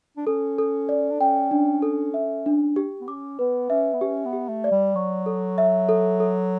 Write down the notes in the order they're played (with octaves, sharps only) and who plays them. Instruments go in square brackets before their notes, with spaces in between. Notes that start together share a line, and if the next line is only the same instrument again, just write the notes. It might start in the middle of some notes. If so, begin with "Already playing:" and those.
[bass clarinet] D4
[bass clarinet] C#4 [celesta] A4
[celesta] A4
D5
[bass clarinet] D4
[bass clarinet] C#4 [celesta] G5
[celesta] D4
A4
E5
D4
G4
[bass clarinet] B3
[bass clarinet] C#4 [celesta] D6
[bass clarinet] B3 [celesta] B4
[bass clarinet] C#4 [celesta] E5
[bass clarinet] B3
[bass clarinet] C#4 [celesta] G4
[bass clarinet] B3
[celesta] G4
[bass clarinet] A3
[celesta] D5
[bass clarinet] G3
[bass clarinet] F#3 [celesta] C#6
[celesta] A4
E5
A4
A4